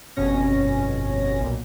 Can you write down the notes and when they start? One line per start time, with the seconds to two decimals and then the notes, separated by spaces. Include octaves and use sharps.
0.16 G1 F2 B2 C#4 A#6
1.40 B1 A#2